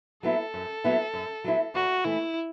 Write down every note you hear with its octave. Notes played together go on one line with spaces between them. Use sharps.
F#3 B3 E4 A4
F#2
F#3 B3 E4
F#2
F#3 B3 E4
E2 F#4
E3 A3 E4